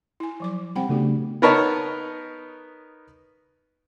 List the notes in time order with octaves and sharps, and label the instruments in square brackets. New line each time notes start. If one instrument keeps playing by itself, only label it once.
[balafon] E4 G#5
F3 F#3 D6
[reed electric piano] G3 C4 [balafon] F#5 G5 B5
[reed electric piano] C#3 A3 D4 [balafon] B3 F#4 G4
[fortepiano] B3 D#4 A#4 B4 C#5 A5